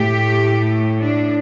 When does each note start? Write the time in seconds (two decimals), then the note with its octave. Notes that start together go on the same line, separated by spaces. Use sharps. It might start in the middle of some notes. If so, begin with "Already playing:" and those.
Already playing: A2 A3 G4
1.01 D4